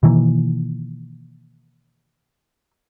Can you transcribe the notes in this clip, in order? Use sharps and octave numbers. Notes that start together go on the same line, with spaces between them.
B2 D#3 E3 A#3